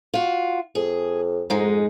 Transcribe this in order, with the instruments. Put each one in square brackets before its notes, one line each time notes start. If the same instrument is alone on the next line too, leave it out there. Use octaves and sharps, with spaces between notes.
[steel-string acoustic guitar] F4 F#4
[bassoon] F2 [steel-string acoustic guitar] G#4
[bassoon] F2 [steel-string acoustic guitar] G#2 G#3 D#4